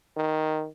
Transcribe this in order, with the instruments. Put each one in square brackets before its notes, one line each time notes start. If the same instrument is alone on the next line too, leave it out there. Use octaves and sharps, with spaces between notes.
[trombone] D#3